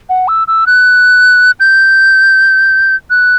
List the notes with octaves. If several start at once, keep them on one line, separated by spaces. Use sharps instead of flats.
F#5
E6
E6
F#6
G6
F#6